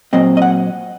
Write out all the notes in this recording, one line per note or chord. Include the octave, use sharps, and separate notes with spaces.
A#2 F#3 C4 D#5
D#5
F#5